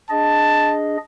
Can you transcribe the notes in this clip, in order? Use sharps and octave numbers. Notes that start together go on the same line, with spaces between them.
D4 G#4 D#5 A5